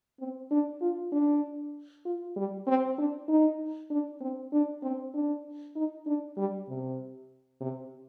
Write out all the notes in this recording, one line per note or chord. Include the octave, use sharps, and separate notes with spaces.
C4
D4
F4
D4
F4
G3
C4
D4
D#4
D4
C4
D4
C4
D4
D#4
D4
G3
C3
C3